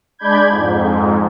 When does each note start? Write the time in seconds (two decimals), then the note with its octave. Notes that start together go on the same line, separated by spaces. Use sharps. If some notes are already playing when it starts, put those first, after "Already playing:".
0.19 G#3 D4 D5 B5 G6 G#6
0.48 F2 G#2